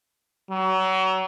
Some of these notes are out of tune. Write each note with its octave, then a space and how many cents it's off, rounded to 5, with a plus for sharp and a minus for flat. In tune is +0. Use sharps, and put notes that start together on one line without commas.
F#3 +30